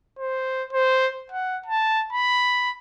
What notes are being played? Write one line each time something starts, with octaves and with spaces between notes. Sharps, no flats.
C5
C5
F#5
A5
B5